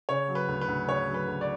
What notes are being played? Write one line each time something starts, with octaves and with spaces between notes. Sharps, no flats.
C#3 C#5
F#3
B4
D2
B4
D2
C#3 C#5
F#3
B4
D2
D5